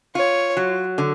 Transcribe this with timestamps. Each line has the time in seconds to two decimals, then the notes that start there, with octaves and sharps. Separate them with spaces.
0.15 F4 C#5
0.57 F#3
0.98 D3